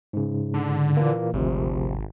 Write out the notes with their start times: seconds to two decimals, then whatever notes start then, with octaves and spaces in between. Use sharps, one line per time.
0.13 G#2 C#3
0.54 D3
0.97 A#2 E3 A#3
1.33 G#1 D2 C3 F3